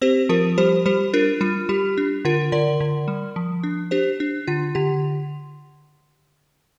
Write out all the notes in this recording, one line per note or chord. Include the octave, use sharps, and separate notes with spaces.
C4 G4 C5
F3 F4 A#4
G3 G4 C5
G3 G4 C5
D4 F4 A#4
G3 F4
G3 G4
D4
D3 F4 A#4
D3 A#4 D5
D3
G3
F3
D4
D4 G4 C5
D4
D3 F4
D3 G4